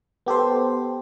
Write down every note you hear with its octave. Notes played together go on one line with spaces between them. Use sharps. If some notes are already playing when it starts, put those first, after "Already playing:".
B3 G4 A4 C5